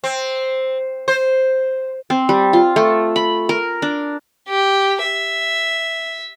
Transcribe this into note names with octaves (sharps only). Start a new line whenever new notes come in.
C4
C5
C4
G3
F4
A3
B5
A#4
D4
G4
E5